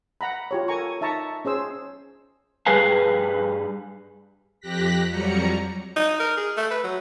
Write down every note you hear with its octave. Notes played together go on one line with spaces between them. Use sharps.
F#5 A#5 B5
F4 G4 C#5
A4 A#4 G#5 A#5 C#6
D#4 E5 A5 A#5 C#6
C#4 G#4 C5 E6
G2 G3 G#4 B4 F5 G#5
F2 G4 F#6 A#6 B6
F2 F#3 G3 A#5 C#7
D#4
A#4
G#4
A3
B4
F#3